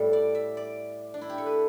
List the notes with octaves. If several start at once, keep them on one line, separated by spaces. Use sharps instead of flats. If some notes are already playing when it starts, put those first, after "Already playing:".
Already playing: A2 G3 G4 A4
D5
E5
D5
D4
E4
G4
A4
B4